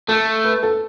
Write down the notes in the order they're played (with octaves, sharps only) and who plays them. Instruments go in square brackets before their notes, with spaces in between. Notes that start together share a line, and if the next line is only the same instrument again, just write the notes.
[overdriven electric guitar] A3 [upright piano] A4
[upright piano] B4
A4